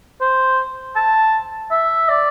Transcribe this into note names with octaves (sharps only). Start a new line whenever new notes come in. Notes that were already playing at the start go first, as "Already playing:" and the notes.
C5
A5
E5
D5